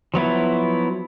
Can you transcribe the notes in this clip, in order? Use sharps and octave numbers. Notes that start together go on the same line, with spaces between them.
F3 F#3 B3 E4